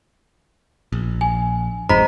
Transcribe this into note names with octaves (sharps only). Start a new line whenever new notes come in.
A#1
G#5
F#1 F2 G#2 C5 D#5 A#5 B5 B6